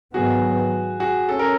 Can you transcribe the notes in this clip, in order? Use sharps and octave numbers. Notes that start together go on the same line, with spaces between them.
G#2 D#3 F#3 B3 F#4 G#4
F#4 G#4
C#4 A4
A#4